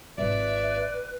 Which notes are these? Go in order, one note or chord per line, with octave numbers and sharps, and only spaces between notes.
G#1 F4 B4 D5 E5